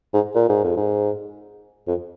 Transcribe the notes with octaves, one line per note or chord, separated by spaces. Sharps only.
G#2
A#2
G#2
F2
G#2
F2